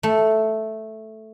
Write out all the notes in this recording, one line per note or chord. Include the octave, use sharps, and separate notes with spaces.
A3